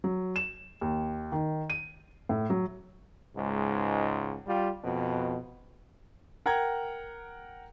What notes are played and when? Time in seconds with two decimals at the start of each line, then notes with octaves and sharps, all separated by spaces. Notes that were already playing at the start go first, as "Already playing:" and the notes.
0.04 F#3
0.36 E7
0.81 D#2
1.32 D#3
1.70 D#7
2.29 A2
2.50 F#3
3.36 C#2 G#2
4.47 G3 F4 G4
4.84 F2 B2
6.46 A#4 F#5 G5 A#5 G#6